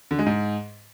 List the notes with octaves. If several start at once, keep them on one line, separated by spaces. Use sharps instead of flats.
D3
G#3
G#2